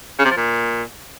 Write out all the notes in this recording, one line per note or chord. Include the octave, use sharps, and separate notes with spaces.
C#3
C3
F3
A#2